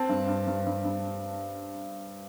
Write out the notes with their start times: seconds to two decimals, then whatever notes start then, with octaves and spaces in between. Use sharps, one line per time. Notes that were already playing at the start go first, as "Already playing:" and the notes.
Already playing: C4 A5
0.09 G2
0.28 G2
0.47 G2
0.66 G2
0.85 G2